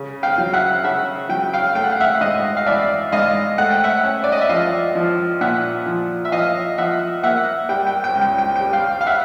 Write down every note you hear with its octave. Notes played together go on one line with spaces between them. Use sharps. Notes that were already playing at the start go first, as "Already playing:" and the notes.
Already playing: C#3
F5 G5
F#3
E5 F#5
C#3 E5 F#5
F#3 G5
F5 G5
A3 G5
F#5
F5
E5 F#5
G#2 D#5 F5
F5
E3 D5 E5
G#2 D#5 F5
A3 F#5
G5
E5 F#5
C#4
D5
D#5
E5
F3 D#5 F5
F3
A#2 E5 F#5
F3
E5
F3 D#5 F5
F3 E5 F#5
A#3 E5 F#5
G3 G5
G5
G5
C#2
G5
G5
G5
G3
F5 G5
F5
E5 F#5